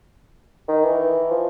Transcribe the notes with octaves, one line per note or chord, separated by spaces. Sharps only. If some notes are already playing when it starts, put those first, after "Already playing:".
D#3
E3
F3